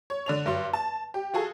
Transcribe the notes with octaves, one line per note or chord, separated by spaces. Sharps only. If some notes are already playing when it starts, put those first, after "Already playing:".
C#5
D3 D4 F7
G2 F#3 C6
A5
G4
F4 F#4 G#4 A4